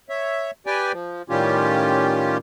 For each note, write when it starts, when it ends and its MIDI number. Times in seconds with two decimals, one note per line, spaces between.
0.09 0.51 73
0.09 0.51 76
0.66 0.92 67
0.66 0.92 71
0.66 0.92 74
0.66 0.92 79
0.66 0.92 80
0.92 1.22 53
1.29 2.37 45
1.29 2.37 51
1.29 2.37 55
1.29 2.37 61
1.29 2.37 65
1.29 2.37 67